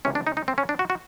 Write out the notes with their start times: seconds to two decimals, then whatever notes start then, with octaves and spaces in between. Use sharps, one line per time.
0.05 C#2 C3 E3 C#4
0.15 D4
0.27 D#4
0.37 D#4
0.48 C4
0.58 C#4
0.69 D4
0.79 F#4
0.90 F#4